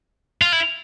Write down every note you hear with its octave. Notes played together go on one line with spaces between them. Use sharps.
F4
E4